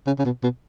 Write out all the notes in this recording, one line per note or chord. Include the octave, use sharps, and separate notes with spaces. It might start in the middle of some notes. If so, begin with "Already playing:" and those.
C#3
C#3
B2
B2